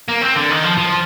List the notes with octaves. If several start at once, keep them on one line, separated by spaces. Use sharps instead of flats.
A#3
C4
D3
D#3
F3
F3